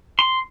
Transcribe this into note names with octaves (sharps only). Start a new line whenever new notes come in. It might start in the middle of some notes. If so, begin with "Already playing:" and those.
C6